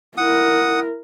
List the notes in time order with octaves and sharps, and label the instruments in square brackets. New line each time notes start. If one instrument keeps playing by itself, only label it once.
[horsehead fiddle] E4 A#4 [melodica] F#5 D#6